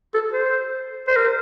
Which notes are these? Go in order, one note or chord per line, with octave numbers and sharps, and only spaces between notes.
A4
C5
C5
A#4